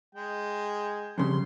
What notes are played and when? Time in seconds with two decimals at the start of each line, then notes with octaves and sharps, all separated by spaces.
0.15 G#3 G5
1.18 F2 C#3 G3 C6